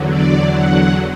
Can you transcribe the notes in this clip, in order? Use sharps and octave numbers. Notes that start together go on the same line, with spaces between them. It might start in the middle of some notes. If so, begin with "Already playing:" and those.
Already playing: E2 D3 F#3
D5
F#5